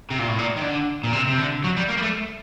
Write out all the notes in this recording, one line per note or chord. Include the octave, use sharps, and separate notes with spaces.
C3
A#2
A2
A#2
D#3
D3
A#2
C3
C3
D3
F#3
G3
A#3
G3
A3